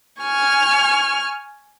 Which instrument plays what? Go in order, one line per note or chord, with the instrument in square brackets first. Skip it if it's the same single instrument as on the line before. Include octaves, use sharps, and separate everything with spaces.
[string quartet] G#5 C#6 F6